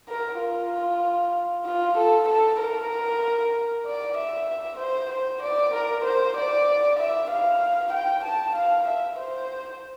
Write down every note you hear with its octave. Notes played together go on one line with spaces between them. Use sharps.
A#4
F4
F4
A4
A4
A#4
D5
E5
C5
C5
D5
A#4
C5
D5
E5
F5
G5
A5
F5
E5
C5